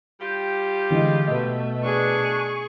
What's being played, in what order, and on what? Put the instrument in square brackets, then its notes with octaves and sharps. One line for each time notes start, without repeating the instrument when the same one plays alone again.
[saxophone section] G3 F4 G4
[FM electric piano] D3 E3 [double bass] G#3
[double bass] B2 A3 [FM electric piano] B4 D#5
[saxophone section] D4 [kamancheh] G#4 C#6